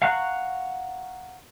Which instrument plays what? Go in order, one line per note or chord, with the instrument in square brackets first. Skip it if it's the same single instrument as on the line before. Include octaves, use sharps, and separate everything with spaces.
[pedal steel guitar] F5 F#5 A#5 C#6 F#6